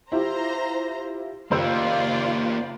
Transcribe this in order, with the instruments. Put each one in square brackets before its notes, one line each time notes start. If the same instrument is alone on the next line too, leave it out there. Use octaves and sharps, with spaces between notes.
[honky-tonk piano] E4 F4 G4 [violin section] C5 A#5
[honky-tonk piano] F#1 C5 E6 [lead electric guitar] A#3 G4 [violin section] F4 D5